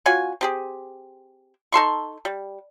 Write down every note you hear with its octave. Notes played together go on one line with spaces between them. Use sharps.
C#4 F4 F#4 G#5
C4 G4 G#4
D#4 A4 C6 C#6
G3